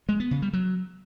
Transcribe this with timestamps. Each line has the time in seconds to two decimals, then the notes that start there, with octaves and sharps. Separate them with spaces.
0.09 G#3
0.20 B3
0.31 C#3
0.42 G3
0.53 F#3